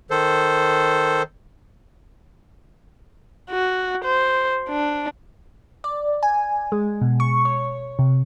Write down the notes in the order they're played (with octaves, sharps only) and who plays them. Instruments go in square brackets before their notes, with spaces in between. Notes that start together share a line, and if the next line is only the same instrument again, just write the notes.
[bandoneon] D#3 A4 C5
[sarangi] F#4
C5
D4
[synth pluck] D5
G#5
G#3
B2
C#6
C#5
C3